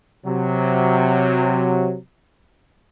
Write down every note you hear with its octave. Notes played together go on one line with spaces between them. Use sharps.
C3 F#3